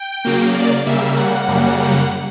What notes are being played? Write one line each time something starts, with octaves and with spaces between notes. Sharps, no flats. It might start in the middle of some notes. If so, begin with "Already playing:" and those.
Already playing: G5
C#3 F#3 A#3
D5
C#3 G3 A#3 E5
F#5
F#2 C#3 G3 A#3